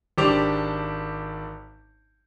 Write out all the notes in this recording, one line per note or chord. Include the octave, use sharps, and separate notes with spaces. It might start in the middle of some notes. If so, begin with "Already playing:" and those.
G#1 D4 G4 C5 D6 F7